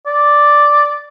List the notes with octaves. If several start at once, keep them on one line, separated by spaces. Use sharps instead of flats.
D5